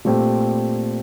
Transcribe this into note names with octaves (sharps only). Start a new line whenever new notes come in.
A#2 A3 C4 G4